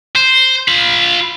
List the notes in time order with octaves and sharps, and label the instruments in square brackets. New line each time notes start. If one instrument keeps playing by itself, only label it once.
[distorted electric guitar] C5
F4 B5